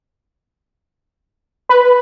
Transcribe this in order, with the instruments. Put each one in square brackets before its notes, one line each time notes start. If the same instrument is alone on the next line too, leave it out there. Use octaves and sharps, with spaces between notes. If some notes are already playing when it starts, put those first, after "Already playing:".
[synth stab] B4